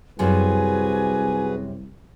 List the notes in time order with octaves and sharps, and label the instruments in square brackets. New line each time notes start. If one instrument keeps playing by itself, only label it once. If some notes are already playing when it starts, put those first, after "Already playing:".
[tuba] C2 [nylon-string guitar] F#2 C3 [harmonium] F#4 G#4 B4 [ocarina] G#5